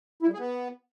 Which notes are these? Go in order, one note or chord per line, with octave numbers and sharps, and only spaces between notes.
E4
G3
G#4
B3